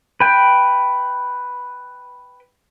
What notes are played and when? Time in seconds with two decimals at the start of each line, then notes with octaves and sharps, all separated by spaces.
0.20 B4 G5